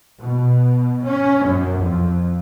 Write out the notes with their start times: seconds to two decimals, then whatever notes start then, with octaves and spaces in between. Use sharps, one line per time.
0.19 B2
1.07 C#4
1.46 F#2
1.77 F2